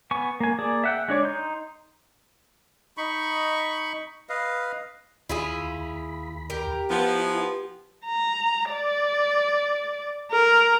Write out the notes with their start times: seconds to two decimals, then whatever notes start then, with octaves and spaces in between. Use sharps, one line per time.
0.11 B3 G#5 C#6
0.40 A#3 G#5
0.59 A#3 G#4 D5 A5
0.84 E5 F#5 G5
1.08 G#3 D4 C#5 D5
1.23 D#4 C6 G6
2.97 D#4 B5 C#6
4.29 B4 D#5 F5
5.29 D#2 E4 F4 G#4 B5
6.50 G4 A#4
6.90 F3 B3 E4 G#5
8.06 A#5
8.72 D5
10.32 A#4